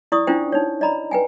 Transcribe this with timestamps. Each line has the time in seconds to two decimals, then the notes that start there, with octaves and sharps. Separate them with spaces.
0.12 E4 D5 C#6 D#6
0.27 C#4 D4 E4 F4 C5 G5
0.52 D#4 C#5
0.81 D5 D#5 A#5 B5
1.11 B4 G5 G#5